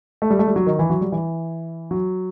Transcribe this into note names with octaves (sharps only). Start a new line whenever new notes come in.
A3
G3
A3
G3
F#3
D#3
E3
F#3
G3
E3
F#3